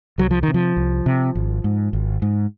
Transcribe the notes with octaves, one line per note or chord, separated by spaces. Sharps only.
C2 F#3
F3
D#3
C3
F3
C2
C3
G#1
G#2
G#1
G#2